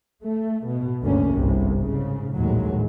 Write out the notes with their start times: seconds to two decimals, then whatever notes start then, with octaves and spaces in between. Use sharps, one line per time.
0.24 A3
0.67 B2
1.03 F#1 D2 G2 D3 A#3 C#4
1.33 G1 C2 G#2 C3
1.79 G#2 C#3
2.38 A#1 D#2 A2 F#3 G#3